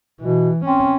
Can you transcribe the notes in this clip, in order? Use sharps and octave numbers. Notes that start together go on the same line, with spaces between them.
B2 E3
C4 C#4